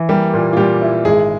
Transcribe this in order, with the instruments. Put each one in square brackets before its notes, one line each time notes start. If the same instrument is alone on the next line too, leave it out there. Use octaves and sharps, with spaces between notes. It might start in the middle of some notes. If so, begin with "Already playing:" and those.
Already playing: [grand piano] E3
[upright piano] G3 G4 [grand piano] A#3
[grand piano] A#2
[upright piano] F4
[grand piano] A#2 [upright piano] G3 G4
[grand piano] E4
[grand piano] G#1 [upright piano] G#3 G#4